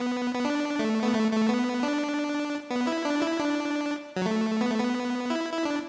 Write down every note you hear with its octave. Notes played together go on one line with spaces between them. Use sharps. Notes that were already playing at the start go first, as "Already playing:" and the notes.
Already playing: B3
B3
D4
A3
B3
A3
A3
B3
D4
B3
E4
D4
E4
D4
F#3
A3
B3
A3
B3
E4
E4
D4